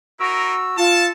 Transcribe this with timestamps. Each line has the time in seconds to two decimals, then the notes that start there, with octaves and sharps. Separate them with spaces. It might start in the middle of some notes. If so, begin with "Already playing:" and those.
0.20 D#4 E4 F#4 A#4 E6
0.77 F4 A4 A5